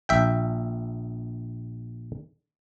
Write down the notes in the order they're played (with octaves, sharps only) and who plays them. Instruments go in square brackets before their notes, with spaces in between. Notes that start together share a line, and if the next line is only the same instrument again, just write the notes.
[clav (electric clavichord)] A#1 E5 G5